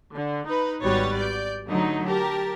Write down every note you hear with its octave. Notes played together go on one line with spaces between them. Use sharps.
D3
D#4 B4
G#1 G3 B3 F#4 C#5 A6
D5 G6
D3 F#3 A3 D#4
G4 A#4 A5